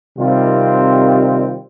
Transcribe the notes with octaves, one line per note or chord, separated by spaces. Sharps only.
C3 D#3 G3 C4 F4